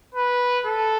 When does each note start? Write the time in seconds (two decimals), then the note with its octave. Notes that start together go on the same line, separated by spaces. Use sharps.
0.14 B4
0.65 A4